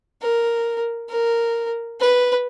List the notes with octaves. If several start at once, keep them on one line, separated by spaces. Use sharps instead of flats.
A#4
A#4
B4